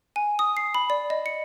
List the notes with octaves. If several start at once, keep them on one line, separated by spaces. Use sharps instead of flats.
G#5
D#6
C7
B5
D5
D#5
C#7